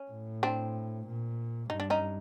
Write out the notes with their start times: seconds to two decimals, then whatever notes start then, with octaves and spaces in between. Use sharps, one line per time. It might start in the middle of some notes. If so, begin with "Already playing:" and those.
Already playing: C#4
0.11 A2
0.43 C4 D4
1.07 A#2
1.70 G2 D#4
1.80 D4
1.90 C#4 D#4